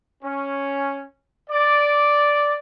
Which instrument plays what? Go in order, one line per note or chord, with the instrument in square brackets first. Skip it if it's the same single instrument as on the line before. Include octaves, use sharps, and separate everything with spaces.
[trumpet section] C#4
D5